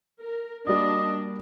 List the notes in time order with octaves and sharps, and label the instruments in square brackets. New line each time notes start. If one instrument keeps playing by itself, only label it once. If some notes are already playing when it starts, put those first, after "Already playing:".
[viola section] A#4
[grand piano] G3 A#3 F#4 [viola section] D4 [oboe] D#5